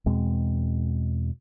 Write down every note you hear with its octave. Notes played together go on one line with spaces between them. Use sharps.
E2 B2 G#3 C4